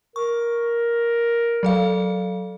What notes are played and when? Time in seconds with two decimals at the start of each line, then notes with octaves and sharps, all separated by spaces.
0.16 A#4 C#6
1.63 F#3 A4 F5